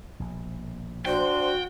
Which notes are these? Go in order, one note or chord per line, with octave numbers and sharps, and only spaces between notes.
A#1 B2
D4 F#4 C5 G5